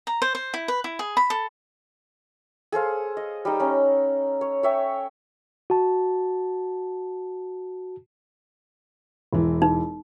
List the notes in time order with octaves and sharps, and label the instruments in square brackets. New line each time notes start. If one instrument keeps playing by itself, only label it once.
[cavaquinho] A#5
C5
C5
E4
B4
E4
G#4
B5
A4
[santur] G#4 A4 C5 F5
D#5
G3 D#4
C#4 D#4
C#5
C#5 E5 G5
[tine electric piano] F#4 A5
[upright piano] E1 E3
[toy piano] D#4